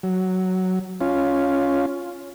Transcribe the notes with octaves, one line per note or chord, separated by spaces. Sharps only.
F#3
C#4 F4